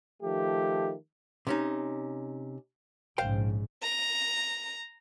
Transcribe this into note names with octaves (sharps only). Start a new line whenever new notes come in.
D#3 F3 A3 G4
C3 C#4 D#4
A#1 G#2 C#3 C5 F5 G5
A#5